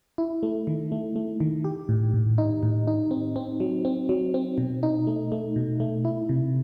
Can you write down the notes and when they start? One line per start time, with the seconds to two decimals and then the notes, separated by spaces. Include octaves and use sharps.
0.18 E4
0.43 A3
0.67 D#3
0.92 A3
1.16 A3
1.40 D#3
1.64 G4
1.89 A2
2.14 A2
2.38 D#4
2.63 A2
2.87 D#4
3.11 C4
3.36 C4
3.60 F#3
3.85 C4
4.09 F#3
4.34 C4
4.58 B2
4.83 D#4
5.07 A3
5.32 A3
5.56 B2
5.80 A3
6.05 E4
6.29 C3